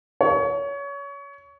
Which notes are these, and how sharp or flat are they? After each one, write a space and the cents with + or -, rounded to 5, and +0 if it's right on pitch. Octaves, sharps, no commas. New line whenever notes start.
C#5 +25